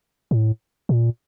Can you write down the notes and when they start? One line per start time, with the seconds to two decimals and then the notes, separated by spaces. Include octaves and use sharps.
0.31 A2
0.89 A#2